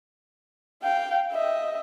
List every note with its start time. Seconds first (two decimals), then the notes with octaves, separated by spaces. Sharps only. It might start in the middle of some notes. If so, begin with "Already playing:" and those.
0.83 F5 G5
1.32 D#5 E5